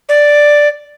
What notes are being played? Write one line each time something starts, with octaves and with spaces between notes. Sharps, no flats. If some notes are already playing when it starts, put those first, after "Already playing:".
D5